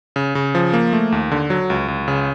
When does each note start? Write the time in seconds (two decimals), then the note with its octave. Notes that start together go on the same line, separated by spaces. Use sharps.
0.16 C#3
0.35 C#3
0.55 F3
0.73 A#3
0.93 A3
1.12 D#2
1.31 D3
1.50 F#3
1.70 C#2
1.88 C#2
2.08 C#3